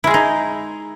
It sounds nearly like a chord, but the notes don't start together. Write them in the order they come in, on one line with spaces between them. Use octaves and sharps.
E4 G#3 G#4 D#4